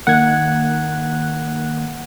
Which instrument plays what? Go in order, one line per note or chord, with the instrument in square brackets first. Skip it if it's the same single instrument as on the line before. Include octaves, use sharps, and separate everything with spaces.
[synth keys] D#3 A#3 F#6 [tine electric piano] F#5 G#6